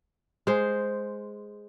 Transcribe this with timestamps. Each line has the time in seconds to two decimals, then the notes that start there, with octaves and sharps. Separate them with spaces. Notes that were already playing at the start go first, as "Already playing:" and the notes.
0.47 G#3 C5